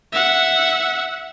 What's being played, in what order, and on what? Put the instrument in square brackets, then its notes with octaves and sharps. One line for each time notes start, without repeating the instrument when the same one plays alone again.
[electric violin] E5 F#5